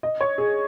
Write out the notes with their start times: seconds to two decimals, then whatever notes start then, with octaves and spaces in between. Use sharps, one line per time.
0.03 D#5
0.21 C#5
0.38 G#4